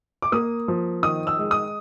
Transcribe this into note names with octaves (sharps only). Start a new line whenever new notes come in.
D6
A#3 D#6
F3
D#3 D#6
E6
G#3
D#6